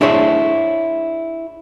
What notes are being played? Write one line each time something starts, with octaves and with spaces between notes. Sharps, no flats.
D4 E4 G#4 C5 C#5 E5